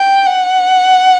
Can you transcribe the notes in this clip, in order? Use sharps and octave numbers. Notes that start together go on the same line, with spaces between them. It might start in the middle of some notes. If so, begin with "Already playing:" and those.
Already playing: G5
F#5